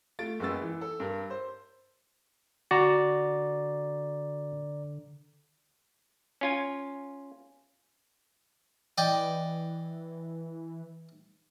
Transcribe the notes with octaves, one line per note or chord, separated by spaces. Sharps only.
A3 F4 A6 D7
F#1 G#3 B3 E6 A6
E3
A4
G2 A#4
C5
D3 F#4 D5 A#5
C#4 F4 G#5
E3 D5 D#5 G5